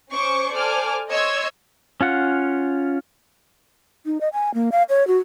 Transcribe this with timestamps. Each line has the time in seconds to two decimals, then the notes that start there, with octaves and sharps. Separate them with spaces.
0.10 C#4 C5 C#6 D6
0.53 A4 C5 D5 G#5 D6 F6
1.11 C#5 D#5 C6 E6 G#6
2.01 C#4 F4 F#5
4.06 D#4
4.21 D#5
4.33 G#5
4.54 A#3
4.72 F5
4.89 C#5
5.08 F#4